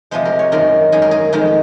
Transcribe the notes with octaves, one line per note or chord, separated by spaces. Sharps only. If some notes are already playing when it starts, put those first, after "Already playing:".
C3 F3 G#3 C5
A#4
C#5
F#2 D#3 G#3 A#4
F#2 D#3 G#3 G#4
A#4
G#4
F2 D#3 G#3